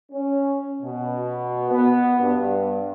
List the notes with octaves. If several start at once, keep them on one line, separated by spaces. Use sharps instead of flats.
C#4
B2
B3
G2